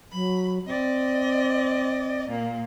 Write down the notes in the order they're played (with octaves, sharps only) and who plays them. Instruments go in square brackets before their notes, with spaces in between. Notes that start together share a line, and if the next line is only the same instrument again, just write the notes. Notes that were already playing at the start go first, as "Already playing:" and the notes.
[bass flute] F#3 [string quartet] B5
[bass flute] C4 [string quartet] D5 D#5
[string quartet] A#2 A#3